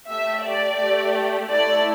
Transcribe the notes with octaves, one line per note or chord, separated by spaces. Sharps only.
A3 G4 E5
D5
A3 G4
A3 E4 A4 D5